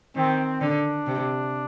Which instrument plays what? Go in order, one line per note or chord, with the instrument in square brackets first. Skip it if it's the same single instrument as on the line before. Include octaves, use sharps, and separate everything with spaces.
[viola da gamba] D#3 [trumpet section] C4
[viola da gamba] D3 [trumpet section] D4
[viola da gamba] C3